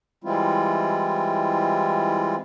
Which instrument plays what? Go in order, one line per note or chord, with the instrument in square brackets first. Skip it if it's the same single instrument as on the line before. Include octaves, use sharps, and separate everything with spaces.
[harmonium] E3 G3 G#3 C4 E4 F4